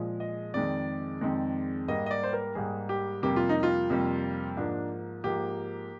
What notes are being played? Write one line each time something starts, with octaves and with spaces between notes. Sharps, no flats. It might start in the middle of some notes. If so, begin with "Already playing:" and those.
Already playing: A#2 F3 G#3
D#5
F2 D#3 G#3 D5
F2 D#3 G#3
G#2 G3 A#3 D#5
D#5
D5
C5
A#4
G#2 G3 A#3 G#4
G4
F2 C3 G3 A#3 G4
F4
D#4
F4
F2 C3 G3 A#3
G#2 F3 A#3 D4
G#2 F3 A#3 G4